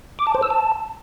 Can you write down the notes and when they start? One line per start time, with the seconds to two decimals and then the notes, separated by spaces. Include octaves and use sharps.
0.19 D6
0.27 A5
0.35 C5
0.42 E6
0.50 A5